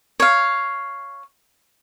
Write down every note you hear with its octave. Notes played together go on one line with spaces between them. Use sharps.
C#5 F5